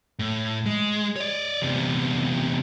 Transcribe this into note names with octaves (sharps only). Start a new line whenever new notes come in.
A2
G#3
C#5 D5
E2 C3